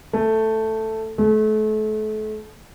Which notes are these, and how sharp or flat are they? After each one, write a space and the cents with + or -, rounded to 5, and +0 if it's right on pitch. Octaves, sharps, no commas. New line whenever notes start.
A3 +5
A3 -35